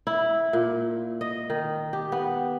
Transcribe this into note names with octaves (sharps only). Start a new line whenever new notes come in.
E4
A#2
D#5
D#3
G4
B3